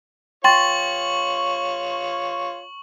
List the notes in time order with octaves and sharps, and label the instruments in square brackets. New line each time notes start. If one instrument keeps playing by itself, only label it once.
[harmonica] F4 C#5 [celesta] G5 C6 A6 [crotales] C#6 F#7